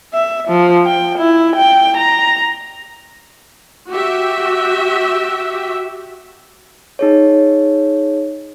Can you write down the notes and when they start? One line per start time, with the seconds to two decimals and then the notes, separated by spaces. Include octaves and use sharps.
0.14 E5
0.48 F3
0.86 G5
1.18 E4
1.56 G5
1.97 A#5
3.90 F#4 G4 E5
6.99 D#4 G#4 C#5